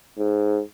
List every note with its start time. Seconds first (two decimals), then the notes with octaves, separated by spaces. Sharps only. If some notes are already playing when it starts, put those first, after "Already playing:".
0.19 G#2